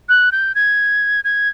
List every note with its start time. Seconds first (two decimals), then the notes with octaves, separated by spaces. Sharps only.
0.09 F#6
0.32 G6
0.55 G#6
1.24 G#6